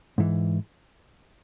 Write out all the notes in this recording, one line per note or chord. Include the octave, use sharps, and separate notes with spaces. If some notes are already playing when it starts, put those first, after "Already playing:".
G#2 E3